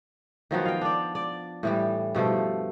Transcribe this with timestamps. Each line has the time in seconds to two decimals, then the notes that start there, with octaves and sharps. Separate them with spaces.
0.51 D#3 F3 F#3 B3
0.65 F5 G5
0.81 D4 D5
1.15 D5
1.63 A2 E3 G3
2.15 G2 B2 F3 A3